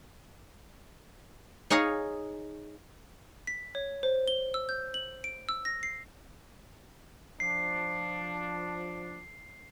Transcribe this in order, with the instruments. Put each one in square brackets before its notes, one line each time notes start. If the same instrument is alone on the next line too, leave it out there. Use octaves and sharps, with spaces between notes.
[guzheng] D#4 G#4 C#5 D#5 F5
[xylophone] B6
C#5
C5
G7
E6
G6
F#7
D7
E6
A#6
C7
[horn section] F3 D4 [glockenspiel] C7